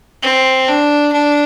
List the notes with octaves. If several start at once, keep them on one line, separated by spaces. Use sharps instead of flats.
C4
D4
D4